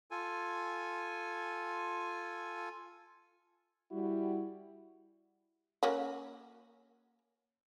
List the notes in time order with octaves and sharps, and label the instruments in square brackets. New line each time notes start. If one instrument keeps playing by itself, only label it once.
[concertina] F4 A4 G#5
[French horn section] G3 E4 F#4
[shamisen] A#3 C#4 F#4